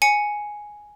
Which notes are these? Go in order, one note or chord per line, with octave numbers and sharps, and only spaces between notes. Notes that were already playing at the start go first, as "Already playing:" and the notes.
G#5 C#7